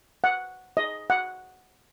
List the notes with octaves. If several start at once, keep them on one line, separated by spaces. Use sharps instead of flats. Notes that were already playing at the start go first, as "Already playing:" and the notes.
F#5
D#5
F#5